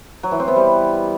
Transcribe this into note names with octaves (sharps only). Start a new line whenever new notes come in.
F#3
E3
C4
B3
G3